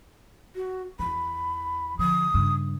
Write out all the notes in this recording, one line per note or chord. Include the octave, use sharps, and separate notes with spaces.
F#4
E2 E3 B5
D3 F3 D#6
G2 C#3